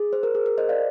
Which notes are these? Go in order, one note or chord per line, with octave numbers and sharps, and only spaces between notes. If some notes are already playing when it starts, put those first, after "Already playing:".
Already playing: G#4
C5
A#4
G#4
A#4
C5 D#5
D5 F5